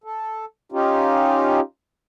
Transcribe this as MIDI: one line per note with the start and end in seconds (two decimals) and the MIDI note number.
0.04 0.45 69
0.72 1.60 61
0.72 1.60 63
0.72 1.60 65
0.72 1.60 67